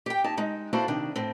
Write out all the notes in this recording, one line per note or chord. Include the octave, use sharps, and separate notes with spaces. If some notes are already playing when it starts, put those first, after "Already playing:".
G4 G5
A#3 D#4 A5
G#3 D#4
A#3 D4 E4 F#4 A4 C5
C3 D#3 D4
A2 C4